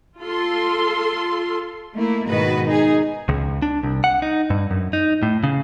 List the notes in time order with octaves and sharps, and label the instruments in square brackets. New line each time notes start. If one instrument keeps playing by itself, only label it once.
[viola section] F4 A4 C6
[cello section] A3 A#3 E4
G#2 B2 D#3 F#4 B4 D#5
D#4 G#4
[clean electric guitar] C#2
D4
C2
F#5
D#4
G2
F#2
D#4
A2
C#3